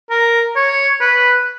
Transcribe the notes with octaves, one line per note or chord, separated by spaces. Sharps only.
A#4
C#5
B4